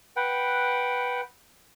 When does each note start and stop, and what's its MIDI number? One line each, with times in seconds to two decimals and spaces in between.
0.16 1.21 71
0.16 1.21 78
0.16 1.21 79